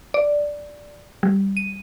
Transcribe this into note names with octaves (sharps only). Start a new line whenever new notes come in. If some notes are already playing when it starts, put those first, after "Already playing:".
D5
G3
D#7